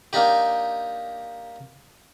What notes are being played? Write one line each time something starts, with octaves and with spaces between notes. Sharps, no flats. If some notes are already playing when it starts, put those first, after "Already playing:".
A#3 D4 D#4 G4